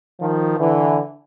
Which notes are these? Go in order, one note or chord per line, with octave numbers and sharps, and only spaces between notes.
D#3 F3
D3 E3